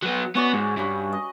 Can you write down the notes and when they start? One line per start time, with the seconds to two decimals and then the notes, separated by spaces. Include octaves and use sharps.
0.02 F#3 B3
0.35 B3 C#4 F#4 D5
0.54 G#2
0.77 G2 C#4 B4
1.13 D#5